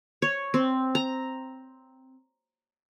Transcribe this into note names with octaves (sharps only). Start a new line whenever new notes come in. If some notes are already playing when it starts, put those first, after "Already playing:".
C#5
C4
A#5